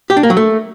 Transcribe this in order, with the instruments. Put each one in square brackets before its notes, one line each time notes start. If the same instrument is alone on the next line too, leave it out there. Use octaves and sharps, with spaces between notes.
[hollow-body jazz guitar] G4
D4
A#3
F#3
A3